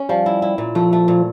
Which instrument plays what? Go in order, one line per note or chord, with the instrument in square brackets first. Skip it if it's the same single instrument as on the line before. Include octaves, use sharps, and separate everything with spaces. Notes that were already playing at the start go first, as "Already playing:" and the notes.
Already playing: [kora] C#4
[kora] F3 [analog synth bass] G3
[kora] E4
E4
A#2
[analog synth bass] F3 [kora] A3
[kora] A3
A#2